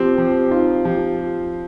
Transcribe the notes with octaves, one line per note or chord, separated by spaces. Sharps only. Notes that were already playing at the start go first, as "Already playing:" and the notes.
Already playing: F3 C4 G4
F3
D#4 F4
F3 G4